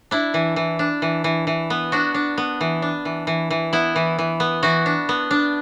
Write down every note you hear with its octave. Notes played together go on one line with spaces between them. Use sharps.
D4 E4
E3
E3
D4
E3
E3
E3
B3
D4 F#4
D4
B3
E3
D4
E3
E3
E3
B3 E4
E3
E3
B3
E3 F#4
D4
B3
D4